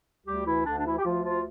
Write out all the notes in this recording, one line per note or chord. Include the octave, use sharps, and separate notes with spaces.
D2 G3 G4
E3 E4
D2 D3 D4
D4
E3 E4
G4
D2 F3 F4
F3 F4